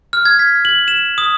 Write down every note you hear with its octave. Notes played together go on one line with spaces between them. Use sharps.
F6
G#6
B6
F#7
E7
D#6